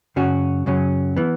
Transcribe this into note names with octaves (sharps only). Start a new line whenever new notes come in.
F#2 C#3 F#3 C#4 F#4
F#2 C#3 F#3 C#4
E3 B3